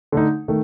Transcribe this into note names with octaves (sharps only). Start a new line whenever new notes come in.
D3 A3 D#4
D#3 A3